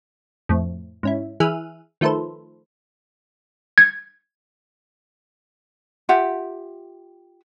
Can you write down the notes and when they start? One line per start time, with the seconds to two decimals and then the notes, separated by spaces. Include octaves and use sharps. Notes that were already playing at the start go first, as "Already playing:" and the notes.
0.49 F2 A2
1.03 G#2 C#4 E4
1.40 E3 G#4 E5 F6 F#6 D#7
2.01 D#3 F3 A3 A4 B4 C5
3.78 G#6
6.09 F4 G4 E5 F#5